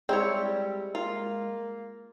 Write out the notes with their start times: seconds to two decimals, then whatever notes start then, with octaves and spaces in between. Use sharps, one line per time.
0.09 G3 G#3 C4 E4 C#5
0.95 A#3 F4